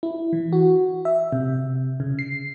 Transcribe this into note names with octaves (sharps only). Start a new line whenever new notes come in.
E4
E3
F#4
E5
C3
C#3
C7